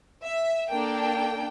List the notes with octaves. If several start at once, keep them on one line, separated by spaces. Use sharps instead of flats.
E5
A#3 D4 A4 G5